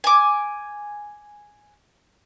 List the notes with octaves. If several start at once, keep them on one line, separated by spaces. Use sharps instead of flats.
G#5 D6